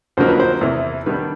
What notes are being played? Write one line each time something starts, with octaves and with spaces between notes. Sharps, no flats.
F2 D3 F#3 A#3 D#4 C5
B4
C5
E2 C3 E3
D#3 G3 B3 D4 B4